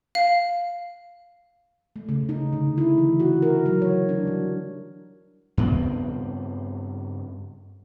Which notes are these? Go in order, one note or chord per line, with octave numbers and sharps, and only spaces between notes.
F5
A3
C#3
D#4
D3
E4
E3
F#4
A#4
F#3
C#5
D4
G3
G2 C#3 B3 C4